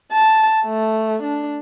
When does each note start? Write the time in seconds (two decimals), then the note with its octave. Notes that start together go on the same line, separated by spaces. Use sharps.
0.13 A5
0.65 A3
1.23 D4